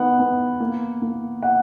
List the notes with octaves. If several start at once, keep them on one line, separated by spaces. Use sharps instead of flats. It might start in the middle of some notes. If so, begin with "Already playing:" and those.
Already playing: D#3 B3 F#5
B3
A#3
A#3
F#5